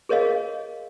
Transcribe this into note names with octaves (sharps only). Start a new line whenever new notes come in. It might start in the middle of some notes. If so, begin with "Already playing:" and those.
G#4 A#4 C#5 D#5 F5